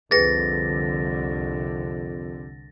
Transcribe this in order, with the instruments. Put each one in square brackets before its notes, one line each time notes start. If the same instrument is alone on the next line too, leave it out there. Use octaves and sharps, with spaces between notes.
[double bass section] C2 D3 [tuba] F2 [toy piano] G#4 B4 G5 [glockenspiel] A6 A#6